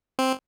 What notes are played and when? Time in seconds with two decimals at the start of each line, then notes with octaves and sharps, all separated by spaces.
0.19 C4